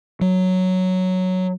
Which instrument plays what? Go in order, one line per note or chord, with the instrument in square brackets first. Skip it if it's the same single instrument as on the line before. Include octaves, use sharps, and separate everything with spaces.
[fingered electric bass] F#3